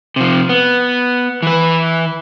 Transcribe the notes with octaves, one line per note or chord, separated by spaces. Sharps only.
C3 F3
B3
E3 B4